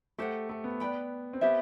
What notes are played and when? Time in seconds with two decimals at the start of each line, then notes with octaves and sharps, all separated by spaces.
0.18 A3 G4 C5 F#5
0.49 A3
0.64 B3
0.80 B4 D5 G5 B5
1.33 C4
1.41 B3 G4 C5 E5